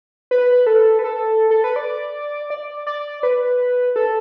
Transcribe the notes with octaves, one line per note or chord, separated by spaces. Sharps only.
B4
A4
B4
A4
A4
B4
D5
D5
D5
B4
A4